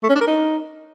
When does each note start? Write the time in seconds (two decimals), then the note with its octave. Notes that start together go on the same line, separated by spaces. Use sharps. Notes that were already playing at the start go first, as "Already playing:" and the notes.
0.03 A3
0.09 C#4
0.15 D4
0.21 A#4
0.27 D#4